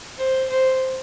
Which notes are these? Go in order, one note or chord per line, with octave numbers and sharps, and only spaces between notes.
C5
C5